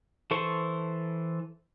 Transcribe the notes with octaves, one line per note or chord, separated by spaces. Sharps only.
E3 A4 C5 C#6